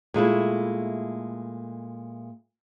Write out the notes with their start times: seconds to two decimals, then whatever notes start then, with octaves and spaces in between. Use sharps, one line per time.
0.14 A#2 G#3 A3 E4